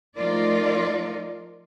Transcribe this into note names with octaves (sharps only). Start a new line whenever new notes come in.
F3 A3 D#4 F4 A#4 D5